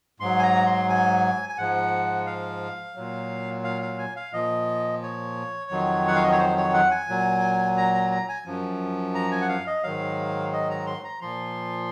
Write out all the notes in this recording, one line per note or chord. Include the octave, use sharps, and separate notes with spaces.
G#2 F#3 C6
G#5
A#5
C6
G#5
G#5
G#2 F3 F#5
F5
A#2 F#3
F5
F5
G#5
F5
A#2 F3 D#5
C#5
F2 D#3 F#3
F#5
F5
D#5
C#5
C5
C#5
F#5
G#5
A#2 F#3
A#5
A#5
A#5
G#5
F#2 F3
A#5
G#5
F#5
F5
D#5
G#2 D#3 F#3 F5
D#5
A#5
C6
A#5
A#2 F3 C6